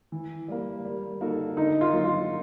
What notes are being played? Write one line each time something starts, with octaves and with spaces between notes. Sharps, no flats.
E3
G3 A#3
G3
A#3 D#4 F#4 A4
D3 D#4
F4
F#3 A#3
F4